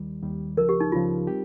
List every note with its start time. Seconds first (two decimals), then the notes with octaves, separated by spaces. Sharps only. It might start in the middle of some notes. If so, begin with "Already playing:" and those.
Already playing: D#2 D#3 G3
0.23 D#2 D#3 G3
0.57 C#2 C#3 F3 A#4
0.69 G4
0.80 D#4
0.92 C#2 C#3 F3 F4
1.27 G3 C4 G4